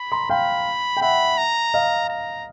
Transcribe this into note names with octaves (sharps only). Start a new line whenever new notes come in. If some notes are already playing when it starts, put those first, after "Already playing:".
Already playing: B5
A#5 C6
F5 G5 B5
G5
E5 F#5 B5
A#5
D#5 F5
A#5